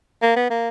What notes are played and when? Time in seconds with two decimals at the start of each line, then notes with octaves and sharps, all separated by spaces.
0.22 A#3
0.36 B3
0.50 A#3